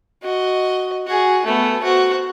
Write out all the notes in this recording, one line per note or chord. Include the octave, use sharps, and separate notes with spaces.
F#4 D#5
F#4 G#4
A3 B3
F#4 C5